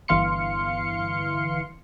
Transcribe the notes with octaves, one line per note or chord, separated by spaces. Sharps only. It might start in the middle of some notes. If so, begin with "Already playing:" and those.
G1 E3 F5 C6 C#7